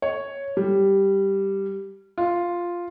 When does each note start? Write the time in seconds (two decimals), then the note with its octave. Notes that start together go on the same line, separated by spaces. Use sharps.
0.02 C#5
0.57 G3
2.18 F4